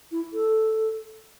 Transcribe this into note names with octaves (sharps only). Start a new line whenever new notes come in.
E4
A4